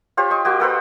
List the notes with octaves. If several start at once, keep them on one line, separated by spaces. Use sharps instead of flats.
F4 G4 C5 C#5
D#5 C6 C#6
A#3 F#4 G4
A#3 A4 B4 C5